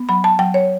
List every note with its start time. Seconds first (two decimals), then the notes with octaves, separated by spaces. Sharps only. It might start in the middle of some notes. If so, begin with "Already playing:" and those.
Already playing: B3
0.09 F#3 B5
0.24 A5
0.39 F#3 G5
0.54 C#5